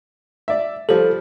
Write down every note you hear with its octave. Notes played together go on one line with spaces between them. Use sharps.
D5 E5
F3 G3 A4